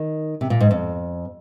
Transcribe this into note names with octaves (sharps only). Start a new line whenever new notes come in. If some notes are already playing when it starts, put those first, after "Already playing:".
Already playing: D#3
C3
A#2
G#2
F2